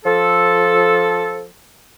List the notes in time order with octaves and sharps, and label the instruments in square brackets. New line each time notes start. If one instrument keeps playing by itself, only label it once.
[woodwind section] F3 A4